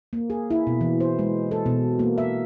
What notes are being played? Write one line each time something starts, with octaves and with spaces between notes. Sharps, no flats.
A#3
G#4
E4
B2
E3
C5
G#3
A4
B2
A#3
E5